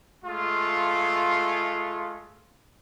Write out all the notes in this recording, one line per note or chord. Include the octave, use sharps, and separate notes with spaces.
G#3 A3 F4